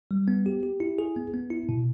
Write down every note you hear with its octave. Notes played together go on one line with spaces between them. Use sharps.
G3
B3
G4
G4
E4
G#4
B3
B3
E4
B2